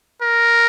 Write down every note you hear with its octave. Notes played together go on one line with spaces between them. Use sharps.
A#4